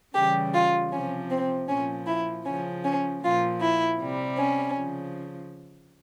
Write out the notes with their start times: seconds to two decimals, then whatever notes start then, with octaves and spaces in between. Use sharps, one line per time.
0.14 C#3 E3 G3 G4
0.54 F4
0.92 C3 F3 C#4
1.30 C4
1.68 A#2 C#4
1.73 F3
2.07 E4
2.45 C#3 F3 C#4
2.84 C#4
3.23 A#2 F3 F4
3.61 E4
3.99 C3 G3
4.38 C#4
4.77 C#3 F3